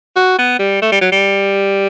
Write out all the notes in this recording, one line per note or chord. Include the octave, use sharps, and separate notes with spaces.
F#4
B3
G3
A3
G3
F#3
G3